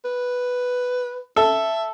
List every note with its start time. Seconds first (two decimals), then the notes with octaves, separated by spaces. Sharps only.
0.04 B4
1.36 A4 E5